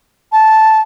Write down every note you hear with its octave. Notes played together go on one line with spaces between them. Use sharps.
A5